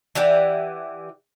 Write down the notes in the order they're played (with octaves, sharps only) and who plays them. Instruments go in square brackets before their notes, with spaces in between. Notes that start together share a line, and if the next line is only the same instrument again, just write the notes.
[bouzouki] E3 G4 D5 F#5